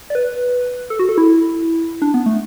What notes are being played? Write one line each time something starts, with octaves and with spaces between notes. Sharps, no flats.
D5
B4
A4
F#4
A4
E4
D4
B3
A3